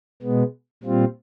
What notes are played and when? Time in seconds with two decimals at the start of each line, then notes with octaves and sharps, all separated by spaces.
0.22 B2 G#3 B3
0.83 A#2 G3 C4 F4